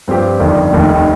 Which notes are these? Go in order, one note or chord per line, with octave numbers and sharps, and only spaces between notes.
G2 F3 C4 G4
G1 F2 D#3 G3 D4
F1 D#2 D#3 G3